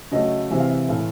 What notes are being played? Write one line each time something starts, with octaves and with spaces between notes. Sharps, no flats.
C#3 F#3 A3 D#5
C3 E3 G#3 E5
F5
E5
A2 E3 A3 F5